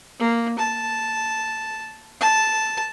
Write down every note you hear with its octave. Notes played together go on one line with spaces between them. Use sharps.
A#3
A5
A5